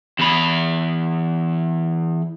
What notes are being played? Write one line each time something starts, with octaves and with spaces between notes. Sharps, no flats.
E2 B5